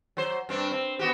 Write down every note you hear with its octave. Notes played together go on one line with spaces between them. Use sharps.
F#3 C5
G2 C4 D4
C4
B3 F#4 G4